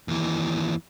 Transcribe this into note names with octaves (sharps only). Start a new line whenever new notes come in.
D#2 E3